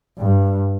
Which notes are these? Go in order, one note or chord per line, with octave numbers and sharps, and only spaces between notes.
G2